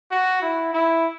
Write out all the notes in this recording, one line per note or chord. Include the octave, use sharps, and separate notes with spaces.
F#4
E4
E4